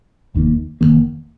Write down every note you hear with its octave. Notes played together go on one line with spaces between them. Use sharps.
F1 D#2 D#3 A#3
F1 D#2 D#3 A#3